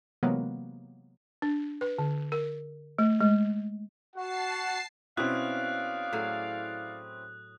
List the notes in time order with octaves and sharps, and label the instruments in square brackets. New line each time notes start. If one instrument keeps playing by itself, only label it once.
[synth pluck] C3 E3 F#3 G#3 A#3 B3
[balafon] D4
B4
D3
A#4
A3
G#3
[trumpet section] F#4 [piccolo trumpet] F#5 [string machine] A5 C7
[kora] B2 [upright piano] C4 C#4 E4 [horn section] D5 F5 [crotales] D#6 F#6
[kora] A2 F#3 G#4